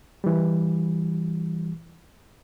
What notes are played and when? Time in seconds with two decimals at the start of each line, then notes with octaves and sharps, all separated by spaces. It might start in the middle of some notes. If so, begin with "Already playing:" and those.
0.24 E3 G3